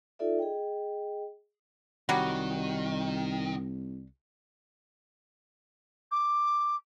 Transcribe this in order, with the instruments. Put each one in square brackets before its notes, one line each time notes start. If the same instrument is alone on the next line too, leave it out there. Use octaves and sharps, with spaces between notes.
[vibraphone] D#4 F4 A4 D5 E5
G#4 D#5 G5
[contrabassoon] C2 [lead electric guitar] D#3 [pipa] F#3 G3 F#4
[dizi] D6